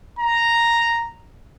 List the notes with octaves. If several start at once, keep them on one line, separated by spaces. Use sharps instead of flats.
A#5